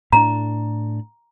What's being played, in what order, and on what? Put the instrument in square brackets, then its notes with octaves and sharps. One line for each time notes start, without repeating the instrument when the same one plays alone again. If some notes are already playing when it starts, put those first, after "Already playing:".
[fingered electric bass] A2 C#4 D4 [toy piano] A#5